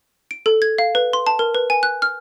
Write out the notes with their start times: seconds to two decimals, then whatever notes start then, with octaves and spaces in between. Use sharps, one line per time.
0.31 D7
0.46 A4
0.62 G#6
0.78 F5
0.95 B4
1.13 C6
1.27 A5
1.39 A#4
1.55 B4
1.70 G#5
1.83 F#6
2.02 F6